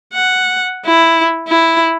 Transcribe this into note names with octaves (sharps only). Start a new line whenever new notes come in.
F#5
E4
E4